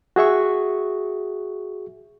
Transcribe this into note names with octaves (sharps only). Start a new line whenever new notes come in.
F#4 G#4 E5 C#6